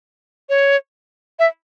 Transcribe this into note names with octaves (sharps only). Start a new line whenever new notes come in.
C#5
E5